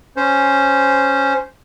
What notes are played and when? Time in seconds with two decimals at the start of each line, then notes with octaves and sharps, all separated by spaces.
0.16 C#4 C5